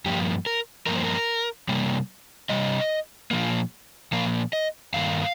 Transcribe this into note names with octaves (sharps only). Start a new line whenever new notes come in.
G2 F3 A#3 G4
A#4
G2 F3 A#3 A#4
C5
A#4
C3 G3 A#3
C3 G3 D#5
A#2 F3 A#3
A#2 F3 A#3 F5
D#5
G2 D#3 A#3 F5